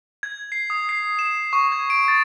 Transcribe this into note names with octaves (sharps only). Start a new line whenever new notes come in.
G#6
C7
D#6
C7
E7
C#6
G#6
D7
A6